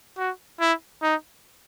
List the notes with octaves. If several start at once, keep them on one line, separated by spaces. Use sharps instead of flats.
F#4
E4
D#4